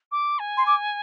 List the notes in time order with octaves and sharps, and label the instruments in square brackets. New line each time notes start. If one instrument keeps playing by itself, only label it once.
[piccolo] D6
G#5
[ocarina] C6
D6